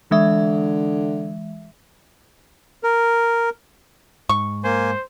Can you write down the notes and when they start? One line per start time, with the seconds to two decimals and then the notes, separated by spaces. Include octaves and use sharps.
0.11 D3 E3 G#3 E5
2.83 A#4
4.29 G#2 C#6
4.64 A#3 C5 G#5